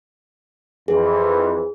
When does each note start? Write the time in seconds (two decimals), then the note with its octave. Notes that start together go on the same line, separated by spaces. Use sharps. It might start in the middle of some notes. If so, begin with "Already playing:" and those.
0.88 F2 E3 G#4